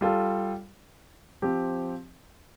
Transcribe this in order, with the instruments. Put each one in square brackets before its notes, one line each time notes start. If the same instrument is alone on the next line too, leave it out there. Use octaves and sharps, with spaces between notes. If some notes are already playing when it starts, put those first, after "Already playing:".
[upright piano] G3 F4 A4
F3 C4 G4